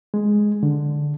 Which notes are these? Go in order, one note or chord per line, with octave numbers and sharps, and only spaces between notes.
G#3
D3